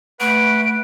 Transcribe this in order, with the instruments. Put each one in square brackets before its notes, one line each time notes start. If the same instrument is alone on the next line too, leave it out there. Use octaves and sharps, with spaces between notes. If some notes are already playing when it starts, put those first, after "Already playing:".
[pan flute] A3 [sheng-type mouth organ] B4 F#5 [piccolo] D7